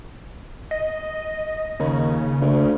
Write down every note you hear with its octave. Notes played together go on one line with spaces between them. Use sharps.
D#5
D#2 C#3
D2